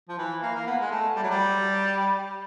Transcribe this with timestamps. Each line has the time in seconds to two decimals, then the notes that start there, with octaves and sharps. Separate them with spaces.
0.09 F3
0.18 E3
0.42 A#3
0.55 A#3
0.67 B3
0.81 G#3
0.91 A3
1.16 G3
1.23 F#3
1.30 G3